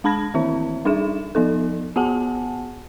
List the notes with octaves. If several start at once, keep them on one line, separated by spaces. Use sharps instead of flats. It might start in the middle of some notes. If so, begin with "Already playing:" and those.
G#3 D4 A5 B5 G#6 A#6
D#3 E3 C4 E4 E5
G3 D4 D#4 G#4 E5 E7
F3 B3 D#4 A4
B3 F#4 G#4 F#5 G#5 A5